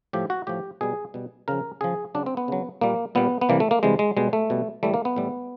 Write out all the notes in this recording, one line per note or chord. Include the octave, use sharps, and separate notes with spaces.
A2 F3 G4
F#4
A2 F3 G4
B2 G3 G#4
B2 G3
C#3 F3 A#4
C#3 F3 G#4
C#3 F#3 D4
C4
B3
C#3 F#3
A#2 G3 A#3
A#2 G3 B3
B3
C3 E3 G3 A#3
A3
A#3
C3 E3 G3 G#3
G#3
B2 G3 G#3
A3
B2 G3
A2 E3 G3 A3
A#3
B3
A2 E3 G3